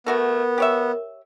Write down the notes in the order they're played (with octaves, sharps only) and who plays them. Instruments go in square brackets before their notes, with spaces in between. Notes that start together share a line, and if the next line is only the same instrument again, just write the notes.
[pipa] A3 F#4 A4 [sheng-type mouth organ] B3 [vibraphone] A#4
[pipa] G4 C#5 E5